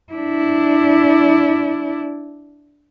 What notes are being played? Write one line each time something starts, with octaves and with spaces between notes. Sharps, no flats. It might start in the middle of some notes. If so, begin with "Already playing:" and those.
D4 E4